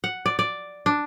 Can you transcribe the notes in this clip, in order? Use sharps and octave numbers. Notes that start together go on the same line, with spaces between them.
F#5
D5
D5
D4